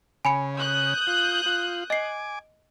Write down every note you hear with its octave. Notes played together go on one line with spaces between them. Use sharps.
C#3 G#5 B5 C#7
D#6 F#6 G6
F4
F4
D#5 G#5 D6 C7